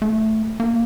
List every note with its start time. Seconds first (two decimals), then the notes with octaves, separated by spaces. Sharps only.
0.02 A3
0.60 A#3